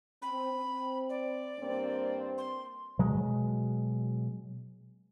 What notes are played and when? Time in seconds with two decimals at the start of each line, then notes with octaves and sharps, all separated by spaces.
0.22 C4 B5
0.52 C4
1.10 D5
1.59 G2 A#3 C4
2.38 C6
2.99 B2 F#3 G#3